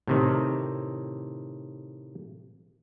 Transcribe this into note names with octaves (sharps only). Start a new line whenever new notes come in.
A2 C3 D#3